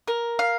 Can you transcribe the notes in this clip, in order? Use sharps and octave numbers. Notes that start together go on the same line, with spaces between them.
A#4
F5